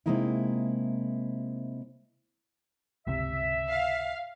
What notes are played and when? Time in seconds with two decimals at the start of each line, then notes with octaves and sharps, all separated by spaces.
0.06 C3 F3 G#3 A#3 D#4 E4
3.07 G1 C#2 C3 E5
3.68 F5